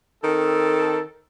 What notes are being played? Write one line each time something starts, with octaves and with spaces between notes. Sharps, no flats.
D#3 C4 A4